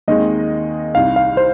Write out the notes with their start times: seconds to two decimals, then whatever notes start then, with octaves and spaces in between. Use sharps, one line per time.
0.08 D#2 D#3 G#3 C4 D#5
0.95 C2 C3 D#3 F5
1.16 F5
1.37 C5